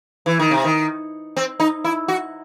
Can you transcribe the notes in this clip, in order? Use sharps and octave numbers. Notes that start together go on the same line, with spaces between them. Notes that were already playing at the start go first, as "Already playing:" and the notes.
E3
D#3
C3
D#3
C4
D#4
E4
F#4